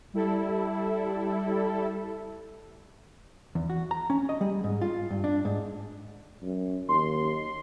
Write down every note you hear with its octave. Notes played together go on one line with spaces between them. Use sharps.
G3 E4 A4
E2
F#4
A#5
C#4
D#5
G3
G#2
F4
G2
D4
G#2
F#2
D#2 C6